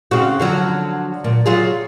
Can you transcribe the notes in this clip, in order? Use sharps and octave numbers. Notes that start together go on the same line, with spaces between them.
C#3 C4 F#4
D3 F3 F#3
A#2
F#3 F4 G#4